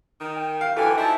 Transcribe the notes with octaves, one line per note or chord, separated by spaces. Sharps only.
D#3
G5
F5
D3 E3 F#4 A4 G5 G#5
F3 D#4 E4 A5